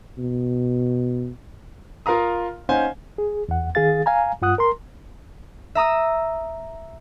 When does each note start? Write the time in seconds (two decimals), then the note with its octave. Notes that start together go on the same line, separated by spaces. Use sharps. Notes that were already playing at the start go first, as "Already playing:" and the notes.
0.18 B2
2.06 F4 A#4 F5 A#5 D#6
2.69 C#4 D#4 C5 F5 F#5 G#5
3.18 G#4
3.49 E2 F#5
3.75 D#3 G#4 F5 A6
4.06 F5 G#5 A#5
4.42 G2 F4 F#5 D#6 F#6
4.58 A#4 A#5 C6
5.75 E5 A#5 D#6 E6